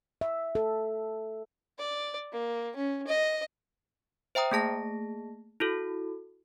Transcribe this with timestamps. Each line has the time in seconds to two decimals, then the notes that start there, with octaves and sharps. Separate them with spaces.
0.21 E5
0.55 A4
1.79 D5
2.33 A#3
2.76 C#4
3.07 D#5
4.35 C5 E5 G5 A#5 D#6
4.51 A3 A#3 G#4 A5 A#6
5.60 E4 F#4 A4